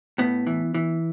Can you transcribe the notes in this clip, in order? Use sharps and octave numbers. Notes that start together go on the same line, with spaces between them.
A2 B3
E3
E3